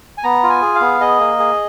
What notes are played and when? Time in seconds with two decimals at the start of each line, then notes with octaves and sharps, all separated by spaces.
0.18 G#5
0.24 B3 A#5
0.43 F4
0.50 G#5
0.62 G#4
0.75 F5
0.81 B3
1.01 G#4 D#5
1.20 A#3
1.39 G#4